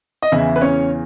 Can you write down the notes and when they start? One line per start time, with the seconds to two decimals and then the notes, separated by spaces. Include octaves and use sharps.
0.22 D#5
0.32 E2 C#3 E3 E4 E5
0.56 B4
0.61 C#4 C#5